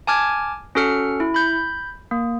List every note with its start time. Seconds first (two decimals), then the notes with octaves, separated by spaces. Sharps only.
0.07 G#5 A5 D6 F6 G#6
0.75 C#4 F#4 A4 F6 C#7
1.20 E4
1.34 B5 G6
2.11 A#3